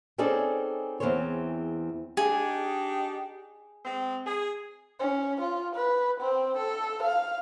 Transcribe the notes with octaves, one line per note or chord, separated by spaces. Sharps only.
C4 C#4 D#4 G#4 A4 D5
E2 D3 C4 G#4 C5 C#5
D4 D#4 G4 G#4
G#3 C4
G#4
C#4
F4
B4
C4
A4
F5